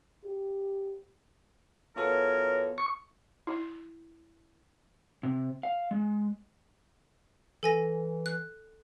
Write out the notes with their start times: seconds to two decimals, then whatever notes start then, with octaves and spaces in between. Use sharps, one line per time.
0.25 G4
1.96 F#2 E3 B3 F4 A4 A#4 C#5
2.78 C#6
3.47 E4
5.23 C3
5.63 F5
5.91 G#3
7.63 E3 A4 G#5 A#6
8.26 F#6